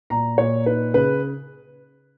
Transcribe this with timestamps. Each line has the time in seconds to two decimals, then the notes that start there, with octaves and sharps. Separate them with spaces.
0.10 A#2 A#5
0.38 A#2 C#5
0.66 D#4 B4
0.94 C#3 B4